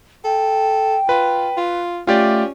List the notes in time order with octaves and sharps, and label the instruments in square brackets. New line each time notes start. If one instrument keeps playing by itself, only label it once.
[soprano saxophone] A4 [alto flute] G5
[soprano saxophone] F4 [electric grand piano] B4
[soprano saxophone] F4
[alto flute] A3 [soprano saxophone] C#4 [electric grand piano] F4 G4 D5